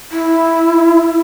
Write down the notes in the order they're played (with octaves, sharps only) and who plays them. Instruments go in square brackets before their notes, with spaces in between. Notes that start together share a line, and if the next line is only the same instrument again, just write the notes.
[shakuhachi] E4